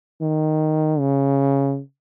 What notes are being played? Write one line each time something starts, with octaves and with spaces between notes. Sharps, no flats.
D#3
C#3